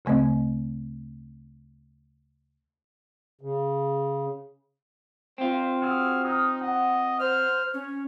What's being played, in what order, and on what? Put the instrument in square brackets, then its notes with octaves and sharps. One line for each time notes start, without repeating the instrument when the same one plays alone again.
[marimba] D2 C#3 A3 C4 D#5
[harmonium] C#3
[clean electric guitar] C4 F4 [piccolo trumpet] C5
[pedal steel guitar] F#4 G#4 E6 [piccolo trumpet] F6
[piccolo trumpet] D#4 [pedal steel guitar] D#6 F6
[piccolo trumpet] D#5 [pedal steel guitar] F#5
[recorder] C5 [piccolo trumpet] F6
[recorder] C#4 [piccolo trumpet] C#5